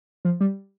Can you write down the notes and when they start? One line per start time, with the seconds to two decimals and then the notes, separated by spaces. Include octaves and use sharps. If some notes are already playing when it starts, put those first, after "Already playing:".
0.25 F3
0.41 G3